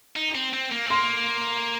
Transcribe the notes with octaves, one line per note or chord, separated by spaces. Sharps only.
D#4
C4
C4
A#3
C4
A#3 C6